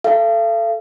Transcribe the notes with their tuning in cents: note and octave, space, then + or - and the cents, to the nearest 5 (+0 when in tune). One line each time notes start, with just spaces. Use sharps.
A4 +0 F5 -45